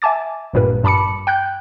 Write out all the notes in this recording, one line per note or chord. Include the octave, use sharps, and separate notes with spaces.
E5 G#5 A5 D6 A6
G#1 G2 A#2 A#4 B4
G2 A5 B5 D6 C#7
G5 F#6 G6